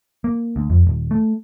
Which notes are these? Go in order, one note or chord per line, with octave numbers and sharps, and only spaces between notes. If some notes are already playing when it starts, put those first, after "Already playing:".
A#3
D2
F2
D#1
A3